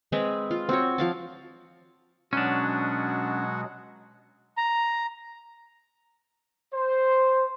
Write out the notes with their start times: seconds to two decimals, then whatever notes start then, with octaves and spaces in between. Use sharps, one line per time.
0.12 G#3 C4 G#4 B4
0.51 F4
0.69 C4 F#4 C#5
0.98 F3 F5 A5
2.33 B2 F#3 G#3 C#4 D4 F#4 F#5
4.57 A#5
6.74 C5